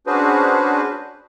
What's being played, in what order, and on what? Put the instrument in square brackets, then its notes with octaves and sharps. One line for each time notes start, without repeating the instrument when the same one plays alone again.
[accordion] C#4 D4 F#4 G#4 B4 C5